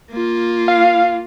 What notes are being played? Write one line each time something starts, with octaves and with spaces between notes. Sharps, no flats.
A#3 F4
F5